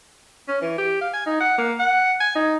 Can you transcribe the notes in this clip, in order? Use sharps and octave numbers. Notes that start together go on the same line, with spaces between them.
C#4
E3
G4
F5
G#5
D#4
F#5
A#3
F#5
G#5
D#4